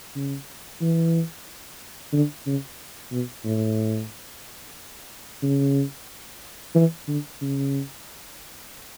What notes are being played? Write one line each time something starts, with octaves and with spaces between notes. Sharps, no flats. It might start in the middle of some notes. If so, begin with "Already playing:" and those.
C#3
E3
D3
C#3
B2
A2
C#3
E3
D3
C#3